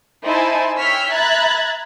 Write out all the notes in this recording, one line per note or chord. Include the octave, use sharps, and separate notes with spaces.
D#4 E4 C5 G#5 A5
C#5 G5 E6 F6 B6
E5 A#5 B5 F#6 G#6 A6